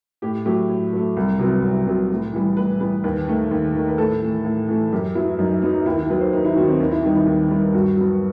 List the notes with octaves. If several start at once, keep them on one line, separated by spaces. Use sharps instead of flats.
A2 G4
F#3 A3 G4
A2
F#3 A3
C2
C3 F#3 B3
C2
C3 F#3 B3
A2
E3 G3 B3
A2 B4
E3 G3 B3 B4
D#2 B4
D#3 A3
D#2
D#3 A3
B4
A2 A4
E3 A3
A2
E3 A3
F#2 G4
F#3 B3 E4
F#2 D#4
F#3 B3 D#4
D#2 E4
E4
D#3 F#3 B3 B4
C5
D#2 D#4
E4
D#3 F#3 B3 F#4
C4
D#2 D#4
E4
D#3 G3 B3 D#4
E4
D#2
D#3 G3 B3
G2 F#4
F#3 B3